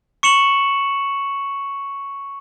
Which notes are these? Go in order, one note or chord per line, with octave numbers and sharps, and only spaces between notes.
C#6 C#7 E7 F#7